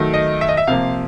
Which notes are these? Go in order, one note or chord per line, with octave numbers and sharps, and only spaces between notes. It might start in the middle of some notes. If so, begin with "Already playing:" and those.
Already playing: D#3 F#3 A3
D#5
E5
D#5
E5
C3 F3 A#3 F5